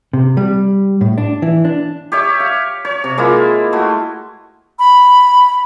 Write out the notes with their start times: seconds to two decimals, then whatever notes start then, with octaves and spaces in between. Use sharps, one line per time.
0.13 C3
0.37 G3
1.01 A2
1.18 D4
1.42 E3
1.65 D4
2.12 G4 C#5 E5
2.40 F5
2.85 C#5
3.04 C3
3.18 G#3 A#3 E4 F4
3.72 A3 F#4
4.79 B5